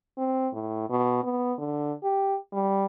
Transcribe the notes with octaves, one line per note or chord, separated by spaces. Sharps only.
C4
A2
B2
B3
D3
G4
G3